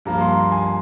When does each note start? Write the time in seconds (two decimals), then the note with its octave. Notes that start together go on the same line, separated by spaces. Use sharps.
0.05 G2 F3 A#3 A#5
0.21 C6
0.29 A#5
0.52 G#5